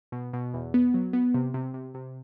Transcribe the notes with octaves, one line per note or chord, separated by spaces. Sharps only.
B2
B2
E2
B3
F#3
B3
C3
C3
C3
C3